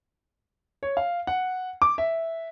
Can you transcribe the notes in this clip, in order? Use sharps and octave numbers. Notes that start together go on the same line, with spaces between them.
C#5
F5
F#5
D6
E5